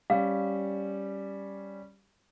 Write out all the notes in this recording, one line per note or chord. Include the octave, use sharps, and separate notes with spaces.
G3 C#4 F5